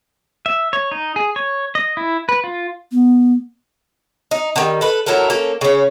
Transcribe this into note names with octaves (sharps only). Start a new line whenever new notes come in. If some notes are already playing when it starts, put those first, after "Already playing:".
E5
C#5
D#4
G#4
C#5
D#5
E4
B4
F4
B3
D#4
D3 D#3 G3
A4 B4
F#3 E4 A4 A#4
A#3 C#4 A4
C#3 C#4